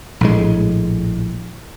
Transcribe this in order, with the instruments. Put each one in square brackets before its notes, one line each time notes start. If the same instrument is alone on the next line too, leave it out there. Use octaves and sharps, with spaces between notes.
[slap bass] A#1 A2 G#3